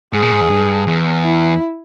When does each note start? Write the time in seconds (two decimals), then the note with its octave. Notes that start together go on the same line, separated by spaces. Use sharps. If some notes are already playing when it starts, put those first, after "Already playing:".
0.13 G#2 G#4
0.22 A#2
0.32 G#2
0.41 E2
0.50 G2
0.87 E2
1.24 E4